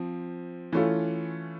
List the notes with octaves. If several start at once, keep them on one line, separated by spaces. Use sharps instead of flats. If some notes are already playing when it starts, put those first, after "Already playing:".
Already playing: F3 C4
E3 A3 C#4 F4